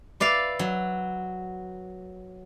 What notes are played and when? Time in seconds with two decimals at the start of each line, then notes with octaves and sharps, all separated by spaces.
0.20 B4 D5 E5 F5
0.59 F#3